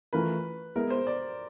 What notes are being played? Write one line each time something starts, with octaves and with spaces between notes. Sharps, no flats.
E3 A3 C#4 F4 A#4 B4
G#3 B3 E4 A#4
C5
D5